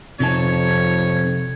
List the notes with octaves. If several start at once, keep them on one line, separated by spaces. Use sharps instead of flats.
F2 C3 D#4 C#5 A5